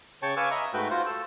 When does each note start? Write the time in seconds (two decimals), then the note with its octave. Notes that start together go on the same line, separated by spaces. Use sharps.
0.22 C#3 C#5 G5 A5 C#6
0.36 B4 F5 G#5 C#6 D6 E6
0.51 D#5 E5 A#5 B5
0.73 G#2 A3 F#4 B4 G5
0.90 F4 F#4 C5
1.06 A4 E6